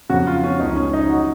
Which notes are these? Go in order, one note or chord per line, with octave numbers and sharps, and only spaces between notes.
F2 C#3 F#3 C#4 F#4
F4
C#4
C#2 C#3 F3 D#4
C#4
D#4
F#4
F#3 C#4